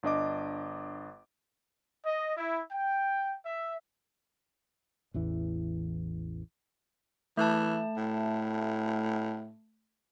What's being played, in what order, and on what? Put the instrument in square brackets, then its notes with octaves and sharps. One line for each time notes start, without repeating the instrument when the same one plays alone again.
[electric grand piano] G1 D4 D#5 D6
[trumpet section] D#5
E4
G5
E5
[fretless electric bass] A1 E2 E3
[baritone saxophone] E3 [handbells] A3 A5
[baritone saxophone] A2